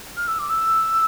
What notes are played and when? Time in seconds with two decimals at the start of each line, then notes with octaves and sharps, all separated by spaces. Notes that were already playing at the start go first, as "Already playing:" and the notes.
0.17 F6
0.27 E6
0.39 D6
0.49 E6